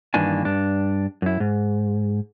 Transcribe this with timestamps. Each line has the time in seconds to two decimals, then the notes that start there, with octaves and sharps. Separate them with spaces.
0.14 G2 D#3 E3 A#3 D4 G#5
0.45 G2 D4
1.22 F#2 E4
1.40 G#2